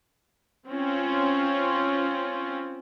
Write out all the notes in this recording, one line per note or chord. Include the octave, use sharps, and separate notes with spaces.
C4 C#4 F4